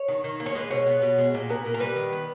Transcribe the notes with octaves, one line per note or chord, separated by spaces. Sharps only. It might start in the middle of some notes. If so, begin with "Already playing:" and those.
Already playing: C#5
D#3
D#3
A#3
C#5
G#3 B4
B2 C#5
B3
B2
G#3
A#2
B3 A#4
A#2
A#4
G3 B4
D#3
B3